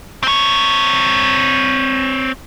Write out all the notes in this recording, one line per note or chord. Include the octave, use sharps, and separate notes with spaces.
C4 C#5